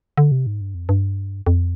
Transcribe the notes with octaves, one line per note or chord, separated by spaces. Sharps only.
D3
C3
G#2
G2
F2
G2
F2